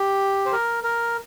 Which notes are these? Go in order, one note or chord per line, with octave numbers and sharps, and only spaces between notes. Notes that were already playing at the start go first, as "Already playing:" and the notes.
Already playing: G4
C5
A#4
A#4